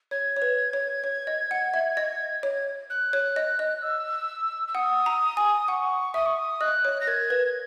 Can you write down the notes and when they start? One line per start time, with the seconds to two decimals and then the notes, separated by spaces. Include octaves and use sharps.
0.11 C#5 G#6
0.36 C#5
0.42 B4
0.73 C#5
1.04 C#5
1.27 D#5
1.51 F#5
1.74 E5
1.97 D#5
2.43 C#5
2.90 F#6
3.13 C#5
3.36 D#5
3.59 D#5
3.82 E6
4.68 E6
4.75 F#5 D#6
5.06 A#5
5.37 G#5
5.68 F#5 C#6
6.14 E5 D#6
6.26 C#6
6.39 D#6
6.61 D#5 F#6
6.85 C#5
7.01 A#6
7.07 A#4 G#6
7.30 B4